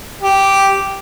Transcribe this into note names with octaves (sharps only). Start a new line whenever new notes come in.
G4